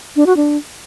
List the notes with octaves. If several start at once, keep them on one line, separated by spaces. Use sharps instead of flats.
D4
F#4
D4